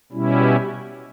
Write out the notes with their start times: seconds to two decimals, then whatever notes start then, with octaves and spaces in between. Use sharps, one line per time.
0.12 B2 G3 C#4 E4